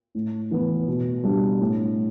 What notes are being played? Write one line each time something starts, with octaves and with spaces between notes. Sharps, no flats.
A2
E3 B3
B2
G3 D4
A2